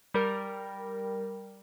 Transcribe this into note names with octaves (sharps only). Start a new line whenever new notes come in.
G3 A#4